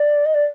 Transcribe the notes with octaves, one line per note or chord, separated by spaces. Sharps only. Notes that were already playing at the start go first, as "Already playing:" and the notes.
Already playing: D5
D#5
D5